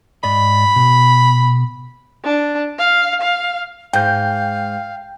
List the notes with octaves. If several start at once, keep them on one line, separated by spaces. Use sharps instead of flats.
G#2 D5 D#5 B5
B2
D4
F5
F5
G#2 F5 G5 G6